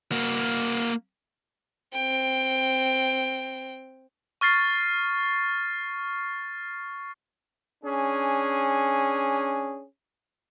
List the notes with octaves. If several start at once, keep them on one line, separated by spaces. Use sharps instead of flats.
A#3 F#4
C4 G5
C#6 F6 A6 C7
C#4 D4 G#4